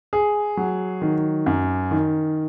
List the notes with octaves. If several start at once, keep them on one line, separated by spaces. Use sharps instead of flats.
G#4
F#3
D#3
F#2
D#3